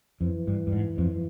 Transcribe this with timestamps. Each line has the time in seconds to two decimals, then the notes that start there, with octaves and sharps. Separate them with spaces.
0.21 F2 E3
0.47 G2
0.67 G2
0.72 G#2
0.98 F2